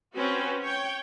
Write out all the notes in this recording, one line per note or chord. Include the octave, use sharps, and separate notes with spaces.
C4 C#4 F#4 B4
C#5 G5